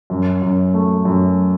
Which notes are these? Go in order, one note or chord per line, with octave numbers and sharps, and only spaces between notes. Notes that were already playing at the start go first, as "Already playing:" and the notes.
F#2
F#2
A3
F#2